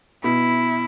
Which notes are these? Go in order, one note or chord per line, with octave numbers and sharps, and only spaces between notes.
B2 E4